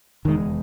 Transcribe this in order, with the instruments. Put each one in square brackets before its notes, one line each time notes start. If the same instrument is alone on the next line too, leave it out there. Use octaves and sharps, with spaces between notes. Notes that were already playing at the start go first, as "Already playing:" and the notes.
[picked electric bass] F1 E2 B2 G#3 [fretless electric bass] D#3